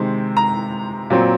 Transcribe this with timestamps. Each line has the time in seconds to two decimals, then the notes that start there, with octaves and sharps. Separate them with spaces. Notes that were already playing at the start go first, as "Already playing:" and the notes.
Already playing: C3 D#3 G#3 C4
0.37 A#5
1.10 A#2 F#3 C4